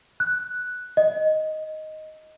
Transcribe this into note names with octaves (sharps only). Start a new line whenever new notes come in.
F#6
D#5